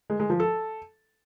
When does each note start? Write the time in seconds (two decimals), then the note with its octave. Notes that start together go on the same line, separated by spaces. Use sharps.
0.10 G#3
0.20 G#3
0.30 F3
0.40 A4